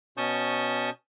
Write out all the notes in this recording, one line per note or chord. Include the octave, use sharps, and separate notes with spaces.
B2 C#4 A5 C#6 D#6 G6